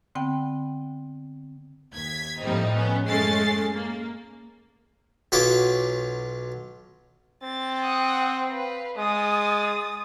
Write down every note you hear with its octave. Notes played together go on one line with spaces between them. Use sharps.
D3 B3 C4 F#5 G5
D#2 G#6 B6
A2 F3 G3 A#3 C4 D#4
B3 C#4
F#2 G#3 A3 C#4 A6 C7
A#3
B1 F#3 F4 B4 C#5 D6
C4 A6
F#5 D#6
B4 F5
G#3 D#6 A6